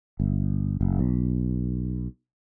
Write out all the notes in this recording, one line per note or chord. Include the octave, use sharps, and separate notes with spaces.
G1
F#1
B1